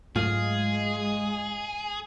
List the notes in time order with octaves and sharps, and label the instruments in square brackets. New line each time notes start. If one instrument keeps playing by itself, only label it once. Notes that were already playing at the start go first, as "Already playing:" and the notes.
[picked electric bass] G#2 F#3 A3 [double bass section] G#3 [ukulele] F4 [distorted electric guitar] G#4